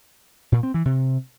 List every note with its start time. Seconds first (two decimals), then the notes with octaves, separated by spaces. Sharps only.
0.52 A#2
0.63 C4
0.74 E3
0.85 C3